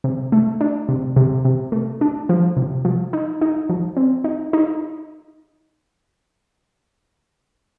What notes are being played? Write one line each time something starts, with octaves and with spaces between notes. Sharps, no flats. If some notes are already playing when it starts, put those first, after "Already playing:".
C3
A3
D4
C3
C3
C3
A3
D4
F3
C3
F3
D#4
D#4
F3
C4
D#4
D#4